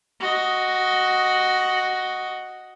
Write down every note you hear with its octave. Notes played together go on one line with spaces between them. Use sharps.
F#4 D#5